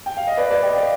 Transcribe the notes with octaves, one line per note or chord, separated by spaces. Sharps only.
G5
F5
D#5
B4 D5
B4 D5
D#5 G5
D5 F5